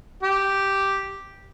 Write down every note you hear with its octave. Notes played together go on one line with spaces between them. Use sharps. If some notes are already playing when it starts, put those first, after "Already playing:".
G4